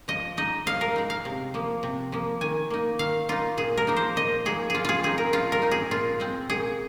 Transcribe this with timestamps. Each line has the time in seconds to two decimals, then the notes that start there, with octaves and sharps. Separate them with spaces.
0.08 F3 D#5
0.37 G#3 D#4 D#5
0.66 F3 F5
0.81 A#4
0.96 G#3 D#4
1.10 F5
1.25 C3
1.54 F3 A#3
1.83 C3
2.12 F3 A#3
2.41 D#3 G#5
2.70 A#3 D#4
2.99 D#3 F5
3.29 A#3 D#4 F4
3.57 A#2 G#4
3.77 A#4
3.87 F3 A#3 D#4
3.97 C5
4.16 A#2 D#5
4.45 F3 A#3 D#4 G#4
4.70 F3 F4 G#4
4.85 F4 G#4
5.03 C4 D#4 G#4
5.18 A#4
5.33 F3 F4
5.52 A#4
5.62 C4 D#4
5.71 G#4
5.91 A#2 F4
6.20 G#3 C4
6.50 A#2 G#4